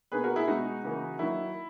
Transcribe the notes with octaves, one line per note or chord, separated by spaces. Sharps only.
B2 A#3 D#4 G#4 B4
F#4 A#4
E4 G#4
B2 G#3 B3 D#4 F#4
C#3 E3 A#3
D#3 F#3 A#3 D#4 E4